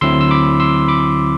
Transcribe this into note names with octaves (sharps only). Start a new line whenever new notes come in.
D2 D3 F#3 C4 E4 C6 E6
E6
B5 D6
C6 E6
B5 D6